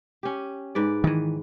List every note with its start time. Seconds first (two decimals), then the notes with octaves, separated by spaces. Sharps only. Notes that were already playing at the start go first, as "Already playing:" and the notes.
0.23 C#4 G4
0.75 G#2 B4 D5
1.04 D#3 E3